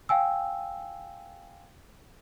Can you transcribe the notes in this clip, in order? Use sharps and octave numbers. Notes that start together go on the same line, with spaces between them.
F5 G5 G#5 E6